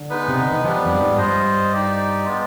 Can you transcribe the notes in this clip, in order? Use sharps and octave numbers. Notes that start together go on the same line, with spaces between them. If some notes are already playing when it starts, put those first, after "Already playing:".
Already playing: D3
G#3 B3 D#4 B4
C3
D3
D#3
F3 G3 B3 D4
F2
G2
G#2
G2 F4 C5 D#5
D#4 G4 D5
G#3 B3 F4